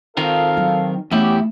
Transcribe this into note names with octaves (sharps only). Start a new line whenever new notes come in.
D#3 C4 F4 A4 A#4 F5
F#3
E2 A3 C#4 E4 G4